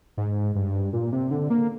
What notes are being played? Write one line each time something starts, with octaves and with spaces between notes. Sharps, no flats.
G#2
G2
A#2
C3
D3
A#3